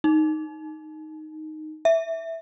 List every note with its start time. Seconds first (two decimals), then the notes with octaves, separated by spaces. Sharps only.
0.04 D#4
1.85 E5